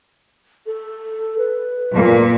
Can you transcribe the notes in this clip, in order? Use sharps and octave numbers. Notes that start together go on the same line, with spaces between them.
A4
B4
A#2